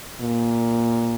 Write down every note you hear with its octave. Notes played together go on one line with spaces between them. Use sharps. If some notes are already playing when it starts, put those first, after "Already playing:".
A#2